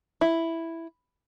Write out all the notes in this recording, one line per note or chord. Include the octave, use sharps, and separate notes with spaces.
E4